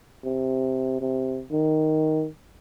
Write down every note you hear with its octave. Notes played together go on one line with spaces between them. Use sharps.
C3
C3
D#3